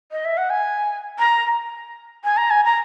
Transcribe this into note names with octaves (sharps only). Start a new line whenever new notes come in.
D#5
E5
F#5
G#5
A#5
G#5
A#5
G#5
A#5